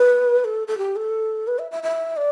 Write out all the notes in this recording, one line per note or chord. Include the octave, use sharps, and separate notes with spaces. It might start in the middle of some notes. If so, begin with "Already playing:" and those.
Already playing: B4
A4
A4
G4
A4
B4
E5
E5
E5
D5